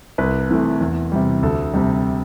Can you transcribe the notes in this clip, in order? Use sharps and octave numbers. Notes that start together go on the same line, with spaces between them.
C2 B4
C3 E3 A3
E2
C3 G3
D2 A4
C3 G3